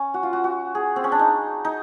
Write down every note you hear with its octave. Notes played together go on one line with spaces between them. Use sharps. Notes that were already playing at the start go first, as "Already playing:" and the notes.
Already playing: C#4
F#4
F4
F#4
F#4
G#4
C4
C#4
D4
D#4
D#4